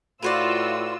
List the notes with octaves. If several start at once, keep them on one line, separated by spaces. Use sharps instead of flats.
A2 F4 F#4 B4 C5 D5 E6